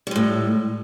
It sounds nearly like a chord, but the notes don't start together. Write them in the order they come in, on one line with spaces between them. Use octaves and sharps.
G3 G#3 A2